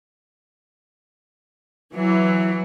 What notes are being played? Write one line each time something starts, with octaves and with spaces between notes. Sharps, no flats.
E3 F#3